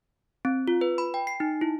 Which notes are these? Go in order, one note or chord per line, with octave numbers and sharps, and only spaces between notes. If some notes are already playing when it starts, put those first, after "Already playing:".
C4
F4
B4
B5
G5
C7
D#4
E4